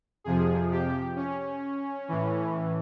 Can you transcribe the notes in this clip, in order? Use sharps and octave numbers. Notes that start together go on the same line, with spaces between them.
F2 C3 F3 G#4
G4
C#4
A2 E3